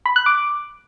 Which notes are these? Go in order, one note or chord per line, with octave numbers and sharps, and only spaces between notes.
B5
F#6
D6